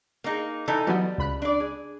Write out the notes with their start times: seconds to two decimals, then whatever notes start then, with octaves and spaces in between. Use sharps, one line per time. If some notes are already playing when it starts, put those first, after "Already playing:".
0.24 A#3 D#4 G#4
0.68 E3 D#4 A4
0.87 E3 F#3 G3 B3
1.18 C#2 B5 F#6
1.42 D4 D5
1.60 G#4